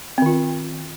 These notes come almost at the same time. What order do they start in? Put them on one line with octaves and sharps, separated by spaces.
C4 D#3 F4